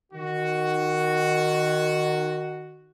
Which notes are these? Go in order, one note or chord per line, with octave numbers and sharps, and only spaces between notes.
D#3 F#4